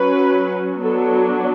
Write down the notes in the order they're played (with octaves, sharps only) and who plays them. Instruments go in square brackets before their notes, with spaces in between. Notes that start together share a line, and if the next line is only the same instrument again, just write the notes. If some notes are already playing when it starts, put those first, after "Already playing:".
Already playing: [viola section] F#3 C#4 B4
F#3 B3 D4 A4